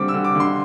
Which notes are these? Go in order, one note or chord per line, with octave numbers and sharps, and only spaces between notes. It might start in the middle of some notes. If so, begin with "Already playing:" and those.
Already playing: D3 G3 C4 D6
E6
D3
D6
D3
C6